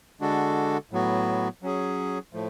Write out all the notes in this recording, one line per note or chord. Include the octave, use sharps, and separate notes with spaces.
D3 G#3 D4 F#4 A4
A2 F#3 B3 F#4
F#3 C#4 G#4
A2 F3 A3